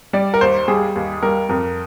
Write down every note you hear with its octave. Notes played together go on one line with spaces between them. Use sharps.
G3 D5
A#4
D#2 C5
G3 G#4
D#2
G3 A#4
F2 A#4